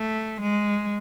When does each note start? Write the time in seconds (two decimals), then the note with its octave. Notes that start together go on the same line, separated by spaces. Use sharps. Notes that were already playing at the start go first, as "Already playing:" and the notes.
Already playing: A3
0.41 G#3